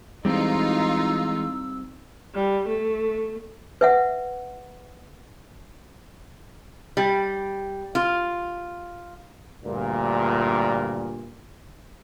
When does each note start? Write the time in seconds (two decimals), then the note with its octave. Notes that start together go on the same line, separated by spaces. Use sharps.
0.25 E3 G3 G#3 C4 D#4 F4 E6
2.35 G3
2.68 A3
3.81 B4 E5 F#5
6.97 G3
7.95 F4
9.64 D2 G2 A#2